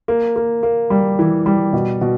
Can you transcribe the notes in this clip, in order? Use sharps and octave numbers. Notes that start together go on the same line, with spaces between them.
A#3
A#3
A#3
G3
E3
G3
B2
B2